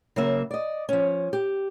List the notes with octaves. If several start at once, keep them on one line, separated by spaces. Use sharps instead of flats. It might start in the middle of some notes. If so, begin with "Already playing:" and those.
C#3 F#3 A#3 E5
D5 D#5
F3 C#4
G4